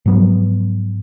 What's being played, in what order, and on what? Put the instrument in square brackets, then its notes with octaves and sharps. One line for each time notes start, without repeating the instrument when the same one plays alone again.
[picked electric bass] G#2 F3 F#3 B3